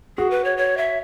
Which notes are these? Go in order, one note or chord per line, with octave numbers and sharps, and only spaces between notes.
F#4 G#4
B4
C#5
C#5
E5